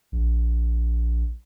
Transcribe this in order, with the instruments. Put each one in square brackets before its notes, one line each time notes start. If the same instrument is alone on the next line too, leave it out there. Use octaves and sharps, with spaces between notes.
[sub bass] A#1